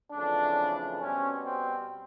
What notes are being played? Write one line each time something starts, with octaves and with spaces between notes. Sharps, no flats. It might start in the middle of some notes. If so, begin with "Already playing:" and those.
F2 C#3 E3 A3 D4
B2 G3 C4 C#4
C4